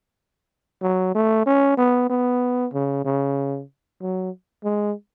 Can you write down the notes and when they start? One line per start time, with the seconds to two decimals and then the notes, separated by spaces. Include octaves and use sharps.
0.82 F#3
1.15 A3
1.46 C#4
1.77 B3
2.09 B3
2.73 C#3
3.05 C#3
4.01 F#3
4.64 G#3